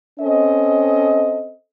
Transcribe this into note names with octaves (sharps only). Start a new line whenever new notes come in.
C4 C#4 A4 D#5